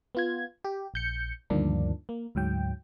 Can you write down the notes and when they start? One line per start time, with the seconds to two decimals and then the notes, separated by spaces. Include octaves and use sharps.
0.15 B3 F4 G#6
0.65 G4
0.94 A#1 G6 C#7
1.50 D2 G2 D#3 F3 A#3 D4
2.09 A#3
2.35 D2 G#2 F#3 G5